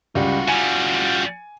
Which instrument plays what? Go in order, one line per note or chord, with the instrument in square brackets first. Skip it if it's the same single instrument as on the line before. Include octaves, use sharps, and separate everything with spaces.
[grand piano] C#2 G3 [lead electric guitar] F4 F#4
[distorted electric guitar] C#3 G3 [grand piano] G#5